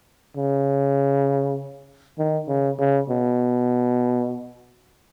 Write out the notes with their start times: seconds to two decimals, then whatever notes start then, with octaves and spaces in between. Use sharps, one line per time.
0.36 C#3
2.18 D#3
2.48 C#3
2.79 C#3
3.10 B2